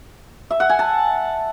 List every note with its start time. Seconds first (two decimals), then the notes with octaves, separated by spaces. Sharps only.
0.50 E5
0.60 F#5
0.70 G#5
0.79 A5